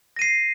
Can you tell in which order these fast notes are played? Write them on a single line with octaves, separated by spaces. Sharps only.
A#6 D#7 C7